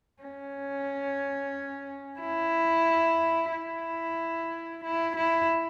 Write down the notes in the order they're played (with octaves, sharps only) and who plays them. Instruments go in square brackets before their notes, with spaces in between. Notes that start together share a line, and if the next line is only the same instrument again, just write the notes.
[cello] C#4
E4
E4
E4
E4